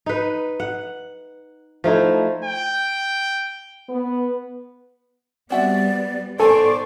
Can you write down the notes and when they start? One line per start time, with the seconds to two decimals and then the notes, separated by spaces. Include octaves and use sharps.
0.06 D#4 B4
0.60 F#5
1.84 F3 A3 D#4 E4
2.45 G5
3.89 B3
5.50 G3 B3 C4 F#4 D5 E5
6.40 D#3 B3 A4 C5 D5 G#5 A#5 C#6